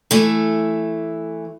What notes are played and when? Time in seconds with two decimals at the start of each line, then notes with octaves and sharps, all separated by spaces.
0.11 E3 A3